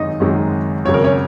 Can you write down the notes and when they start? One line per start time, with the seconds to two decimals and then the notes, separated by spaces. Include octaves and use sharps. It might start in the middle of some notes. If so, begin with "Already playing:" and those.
Already playing: G#1 F#2 D#3 G#3 D#4 D#5
0.20 G#1 F#2 D#3 G#3
0.85 G#1 F#2 C#3 C#5
0.94 A#4
1.04 C#4 C#5